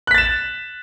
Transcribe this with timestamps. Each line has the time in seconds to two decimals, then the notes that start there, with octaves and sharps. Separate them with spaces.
0.07 F#6
0.11 B6
0.14 A6
0.18 E7